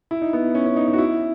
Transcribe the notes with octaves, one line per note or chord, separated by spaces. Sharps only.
E4
D#4
B3
C#4
C#4
D#4
D#4
F#4
E4